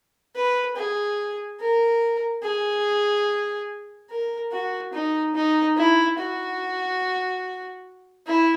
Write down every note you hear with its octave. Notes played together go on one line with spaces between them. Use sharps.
B4
G#4
A#4
G#4
A#4
F#4
D#4
D#4
E4
F#4
E4